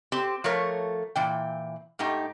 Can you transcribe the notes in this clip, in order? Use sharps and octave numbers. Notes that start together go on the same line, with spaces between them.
C4 G4
F3 A3 A#4 C#5
A#2 E3 G5
G#2 A3 D#4 G4